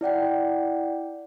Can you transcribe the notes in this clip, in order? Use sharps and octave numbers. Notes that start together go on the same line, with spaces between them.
E4 D5 F#5 G5